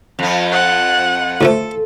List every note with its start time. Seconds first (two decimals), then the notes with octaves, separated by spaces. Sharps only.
0.19 F2 F3
0.52 F#5
1.41 D2 F3 A3 A4